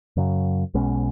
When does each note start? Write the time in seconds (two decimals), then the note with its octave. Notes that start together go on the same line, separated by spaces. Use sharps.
0.17 F#2 C#3 F#3
0.74 B1 B2 G#3 C#4